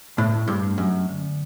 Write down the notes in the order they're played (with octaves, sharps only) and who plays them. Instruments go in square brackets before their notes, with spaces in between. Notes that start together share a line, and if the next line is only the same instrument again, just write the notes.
[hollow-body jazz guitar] A2 [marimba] A3
[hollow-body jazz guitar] G2
[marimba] A3
[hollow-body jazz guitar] F#2
[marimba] D3